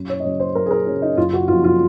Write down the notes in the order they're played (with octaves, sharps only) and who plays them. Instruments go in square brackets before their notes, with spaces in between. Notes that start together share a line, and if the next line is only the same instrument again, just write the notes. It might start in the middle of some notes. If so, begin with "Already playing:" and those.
Already playing: [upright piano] F#2
C#5
D#5
C#3 F#3 C#5
C5
F#2 A#4
G#4
A#4
C#3 C#4
F#3
D#4
F#1 F4
F#4
F2 C#3 F3 F4
F4